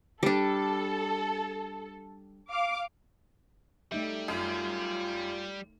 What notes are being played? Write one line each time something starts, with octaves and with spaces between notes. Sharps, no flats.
G3 D4 A4
F5 D6
G3 A3 D#4 E5
F#2 F4